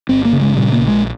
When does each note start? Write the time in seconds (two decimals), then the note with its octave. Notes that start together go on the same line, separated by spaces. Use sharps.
0.09 G1 C4
0.25 A#3
0.33 C#3
0.41 G#3
0.56 A#2 G3
0.72 A#3
0.80 A#1
0.88 G#3